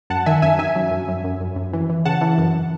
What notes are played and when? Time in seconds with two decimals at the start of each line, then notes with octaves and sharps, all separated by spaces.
0.10 F#2 F#5 A5
0.26 D#3 E5 G#5
0.42 F#2 E5 G#5
0.59 D#3 E5 G#5
0.76 F#2
0.91 F#2
1.08 F#2
1.24 F#2
1.40 F#2
1.56 F#2
1.73 E3
1.89 E3
2.05 C#3 F#5 A5
2.21 E3
2.38 F#2